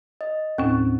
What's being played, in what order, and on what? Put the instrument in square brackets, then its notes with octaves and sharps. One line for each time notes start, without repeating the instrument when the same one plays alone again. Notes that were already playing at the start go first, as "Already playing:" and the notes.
[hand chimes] D#5
[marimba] D#2 A2 C#4 [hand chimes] C4